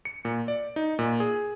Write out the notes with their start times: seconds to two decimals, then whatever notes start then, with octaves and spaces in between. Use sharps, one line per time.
0.05 C#7
0.25 A#2
0.48 D5
0.76 D#4
0.99 A#2
1.20 G#4